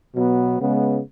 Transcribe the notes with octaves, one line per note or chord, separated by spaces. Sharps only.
B2 F#3 B3
C#3 G#3 B3